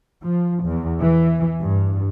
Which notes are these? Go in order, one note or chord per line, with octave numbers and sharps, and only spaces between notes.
F3
E2
E3
G2